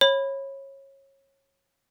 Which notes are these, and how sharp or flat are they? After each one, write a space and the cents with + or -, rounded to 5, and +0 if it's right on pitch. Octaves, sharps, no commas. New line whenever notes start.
C#5 -25 B5 +0